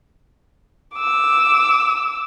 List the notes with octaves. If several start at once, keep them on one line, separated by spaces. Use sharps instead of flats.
D6 E6